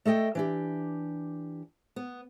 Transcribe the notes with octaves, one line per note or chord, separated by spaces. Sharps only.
A3 A4 D#5 G5
E3 D4 G4
B3